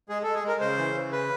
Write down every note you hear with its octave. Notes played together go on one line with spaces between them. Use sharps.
G#3 G#4
G#3 A4
G#4
G#3 A#4
C#3 C5
E3
C#3
B4